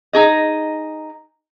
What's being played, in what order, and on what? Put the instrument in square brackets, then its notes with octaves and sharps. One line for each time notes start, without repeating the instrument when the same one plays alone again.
[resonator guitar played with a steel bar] D#4 G#4 D#5